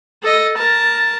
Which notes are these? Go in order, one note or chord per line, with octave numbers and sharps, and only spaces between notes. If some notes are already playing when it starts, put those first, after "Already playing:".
A4 D#5
A#4 A5